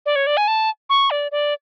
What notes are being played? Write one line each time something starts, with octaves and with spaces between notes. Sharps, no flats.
D5
C#5
D5
G#5
A5
C#6
D5
D5